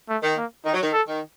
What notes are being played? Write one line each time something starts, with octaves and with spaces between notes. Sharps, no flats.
A3
D#3
A#3
D#3 D#4
F#3
D#3
A4
D#3